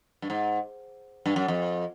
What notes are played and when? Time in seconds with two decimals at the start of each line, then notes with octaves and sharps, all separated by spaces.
0.22 G2
0.30 G#2
1.26 G2
1.36 F#2
1.48 F2